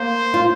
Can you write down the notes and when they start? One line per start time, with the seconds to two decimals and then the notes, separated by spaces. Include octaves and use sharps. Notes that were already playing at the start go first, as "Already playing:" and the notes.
Already playing: A#3 C5
0.34 F4